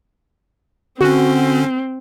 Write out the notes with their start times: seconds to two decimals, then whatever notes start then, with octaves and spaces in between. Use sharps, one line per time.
1.01 D3 C4 C#4 F#4